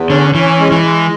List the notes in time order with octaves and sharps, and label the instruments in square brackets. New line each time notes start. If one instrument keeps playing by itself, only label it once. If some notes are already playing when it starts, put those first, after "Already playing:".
Already playing: [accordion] E2
[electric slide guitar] D3 [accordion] C#4
[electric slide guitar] E3 [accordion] C#4
[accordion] G#3
[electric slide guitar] E3
[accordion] G#3